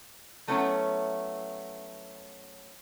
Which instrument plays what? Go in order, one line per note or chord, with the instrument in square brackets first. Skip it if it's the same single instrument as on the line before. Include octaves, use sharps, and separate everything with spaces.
[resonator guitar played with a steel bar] F#3 A3 B3 C#4 E4